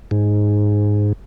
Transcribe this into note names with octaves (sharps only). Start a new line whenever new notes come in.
G#2